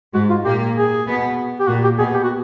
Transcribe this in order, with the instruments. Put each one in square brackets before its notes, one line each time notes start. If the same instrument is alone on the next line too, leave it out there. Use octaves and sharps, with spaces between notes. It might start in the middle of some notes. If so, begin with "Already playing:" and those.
[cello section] G#2 G#3 [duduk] F#4
[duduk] F4
[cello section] A#2 A#3 [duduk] G4
[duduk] G#4
[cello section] B2 B3
[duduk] G4
[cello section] A#2 A#3 [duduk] F#4
[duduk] G4
[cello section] B2 B3 [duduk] G#4
[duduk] G4
F#4